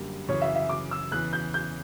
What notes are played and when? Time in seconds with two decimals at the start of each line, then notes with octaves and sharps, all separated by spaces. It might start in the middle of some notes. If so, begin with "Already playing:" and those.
Already playing: F#2 D3 G3 A#3
0.28 F#2 C#3 E3 C#5
0.42 E5
0.55 E5
0.69 D6
0.91 E6
1.11 E2 C#3 E3 F#6
1.33 G6
1.54 G6